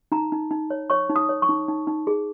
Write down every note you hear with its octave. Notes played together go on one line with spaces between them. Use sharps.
D#4 A#5
D#4
D#4
C#5
C#5 C#6
D#4
D#6
C#5
C#6
D#4
D#4
D#4
G#4